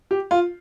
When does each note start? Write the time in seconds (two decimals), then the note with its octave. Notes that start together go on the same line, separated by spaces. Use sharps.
0.11 G4
0.31 F4